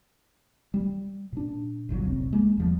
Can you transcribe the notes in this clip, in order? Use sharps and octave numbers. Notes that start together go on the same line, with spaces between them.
G3
A#2 D4
G#1 D2 A#2 F#3
F1 C2 C4
G#3 A#3
E2 F3 G3